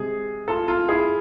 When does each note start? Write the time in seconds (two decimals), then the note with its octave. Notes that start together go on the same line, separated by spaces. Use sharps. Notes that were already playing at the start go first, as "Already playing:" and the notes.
Already playing: C3 G#3 G#4
0.48 F4 A4
0.68 F4 A4
0.89 E4 G#4